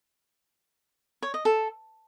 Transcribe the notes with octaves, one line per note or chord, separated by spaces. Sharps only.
C#5
D#5
A4